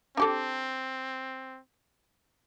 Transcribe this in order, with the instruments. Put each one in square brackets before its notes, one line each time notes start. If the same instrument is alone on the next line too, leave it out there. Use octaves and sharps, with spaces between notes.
[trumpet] C4 [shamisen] D4 G4 A4